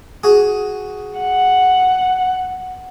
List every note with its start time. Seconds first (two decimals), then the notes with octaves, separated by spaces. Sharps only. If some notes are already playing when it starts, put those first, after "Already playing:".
0.24 F#4 G#4
1.19 F#5